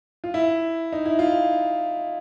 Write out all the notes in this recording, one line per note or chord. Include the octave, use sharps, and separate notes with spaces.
F4
E4
D#4
E4
F4